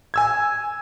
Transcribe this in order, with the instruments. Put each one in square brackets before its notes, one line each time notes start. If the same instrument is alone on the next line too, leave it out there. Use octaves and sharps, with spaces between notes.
[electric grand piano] G#5 E6 G#6